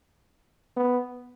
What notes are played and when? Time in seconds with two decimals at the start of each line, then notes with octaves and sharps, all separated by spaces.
0.77 B3